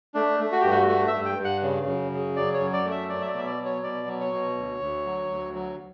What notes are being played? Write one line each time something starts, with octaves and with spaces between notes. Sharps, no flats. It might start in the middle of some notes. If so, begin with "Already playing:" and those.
A3 D4
A3
F#4
G2 G4
F#4
A3 F#4
E5
G2
G5
G2
F#5
C#3
F#2
C#3
F#3 D5
C#5
F#2
D5
A3
E5
F#3 D5
E5
D5
B2 E5
D5
F#3
C#5
B2 D5
F#3
C#5
B2
D2
D2
F#3
D2
F#3